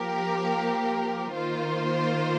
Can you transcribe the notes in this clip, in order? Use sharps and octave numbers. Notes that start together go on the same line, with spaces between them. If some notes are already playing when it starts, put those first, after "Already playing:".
Already playing: F3 A#3 G4 A#4
D#3 A#3 F4 C5